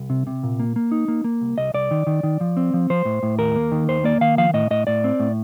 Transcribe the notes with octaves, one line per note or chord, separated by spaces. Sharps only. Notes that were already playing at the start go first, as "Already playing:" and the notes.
Already playing: C2
C3
C3
A#2
A#3
A#3
D#4
A#3
A#3
C2
C2 D#5
C2 D5
D#3
D#3
D#3
F3
C4
F3
F3 C5
A2
A2
D#2 A#4
A#3
D#3
D#2 C5
A#3 D5
D#3 F5
F3 F5
A2 D#5
A2 D#5
A2 D5
C4
A2